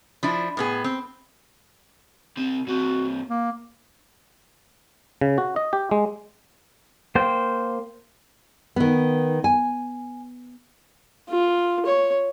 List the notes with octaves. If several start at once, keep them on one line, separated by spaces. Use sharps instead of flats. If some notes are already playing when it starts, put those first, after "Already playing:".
F3 D4 E4
A2 B3 G#4
C4
C2 C4
G2 C4 F#4
A#3
C#3
F#4
D#5
G4
G#3
A#3 C5 G5
D#3 B3
G#5
F4
C#5